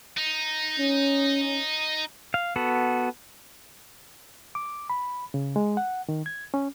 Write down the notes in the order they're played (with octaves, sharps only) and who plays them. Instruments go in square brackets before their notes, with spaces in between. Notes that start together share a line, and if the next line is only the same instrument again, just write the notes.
[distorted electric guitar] D#4
[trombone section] C#4
[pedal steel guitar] F5
B3 F#4 A4
[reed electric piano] D6
B5
C#3
G#3
F#5
D#3
G#6
C#4